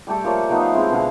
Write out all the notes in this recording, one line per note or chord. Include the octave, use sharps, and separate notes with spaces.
G3 A3 G4 A4
F3 A#3 C#5 D5
F3 A3 B3 D#4
F5
G#3 C4 E4 C5
B2 D3 F5